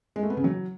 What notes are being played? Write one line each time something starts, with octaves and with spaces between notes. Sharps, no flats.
G#3
A3
B3
C#3
F#3